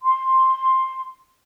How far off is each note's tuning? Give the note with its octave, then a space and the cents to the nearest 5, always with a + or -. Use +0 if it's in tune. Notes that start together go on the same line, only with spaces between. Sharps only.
C6 +5